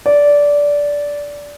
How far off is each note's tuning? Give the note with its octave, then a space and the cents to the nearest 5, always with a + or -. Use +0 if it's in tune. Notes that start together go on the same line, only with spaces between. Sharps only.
D5 -15